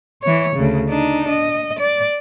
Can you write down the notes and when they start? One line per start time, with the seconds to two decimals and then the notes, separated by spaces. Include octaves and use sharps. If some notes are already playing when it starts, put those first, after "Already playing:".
0.22 E3 C#5
0.56 D2 C#3
0.88 D4 D#4
1.29 D#5
1.79 D5